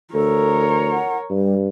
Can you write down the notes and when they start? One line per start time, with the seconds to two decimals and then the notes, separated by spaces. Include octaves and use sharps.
0.14 D2 A4 A#4 C#5
0.92 F#5
1.30 G2 G3